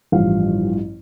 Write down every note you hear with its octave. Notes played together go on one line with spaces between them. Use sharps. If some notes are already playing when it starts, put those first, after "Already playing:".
A1 G2 F3 F5